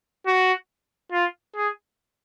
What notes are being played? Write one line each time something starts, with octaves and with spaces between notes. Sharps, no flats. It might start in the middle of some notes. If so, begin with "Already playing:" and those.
F#4
F4
G#4